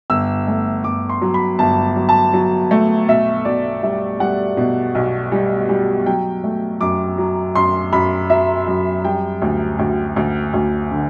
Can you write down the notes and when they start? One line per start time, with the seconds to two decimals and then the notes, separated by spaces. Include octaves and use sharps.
0.10 G1 E6
0.47 A3
0.84 G1 D6
1.09 C6
1.22 F#3
1.34 B5
1.59 G1 A5
1.96 F#3
2.09 A5
2.34 F#3
2.71 A3
3.08 B1 E5
3.45 B1 D5
3.83 G3 E5
4.20 G3 F#5
4.57 B2
4.95 B1
5.32 G3
5.69 G3
6.06 F#3 G5
6.44 A3
6.81 F#2 D6
7.18 F#3
7.55 F#2 C6
7.93 F#2 B5
8.30 F#3 E5
8.68 F#2
9.05 G3 G5
9.42 D2
9.79 D2
10.16 D2
10.54 D2
10.91 D3